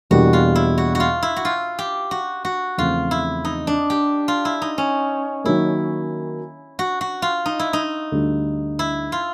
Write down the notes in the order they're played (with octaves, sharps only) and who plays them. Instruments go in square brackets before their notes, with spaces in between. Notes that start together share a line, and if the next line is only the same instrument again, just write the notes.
[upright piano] E2 B2 G3 A#3 D4 [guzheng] F#4
[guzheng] F4
E4
F#4
F#4
F4
E4
F#4
F4
G4
F#4
F#4
[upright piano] E2 C#3 F3 A3 C4 [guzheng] F4
[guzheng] E4
D#4
D4
G4
F4
E4
D#4
C#4
[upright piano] D#3 F#3 A#3 [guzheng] E4
[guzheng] F#4
F#4
F4
D#4
E4
D#4
[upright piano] D2 D3 G3
[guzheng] E4
F4